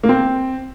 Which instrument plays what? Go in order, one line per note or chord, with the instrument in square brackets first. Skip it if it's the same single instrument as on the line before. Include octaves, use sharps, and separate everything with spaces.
[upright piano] A#3
C4